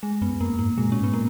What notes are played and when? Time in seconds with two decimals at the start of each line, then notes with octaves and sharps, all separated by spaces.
0.03 G#3
0.21 F#2 B3
0.40 F#2 A#3
0.59 G#2 A#3
0.77 B2 G#3
0.89 A#2 C#4
1.01 G#2 B3
1.13 A#2 A#3